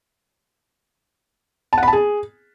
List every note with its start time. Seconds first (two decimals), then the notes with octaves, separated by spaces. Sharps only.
1.73 A5
1.78 F#5
1.83 B5
1.88 A5
1.93 G#4